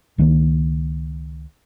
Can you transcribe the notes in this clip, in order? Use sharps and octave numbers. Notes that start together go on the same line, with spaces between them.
C#2 D#3 F#3 A#3